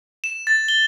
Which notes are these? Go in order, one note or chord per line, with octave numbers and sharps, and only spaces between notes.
E7
A6
G7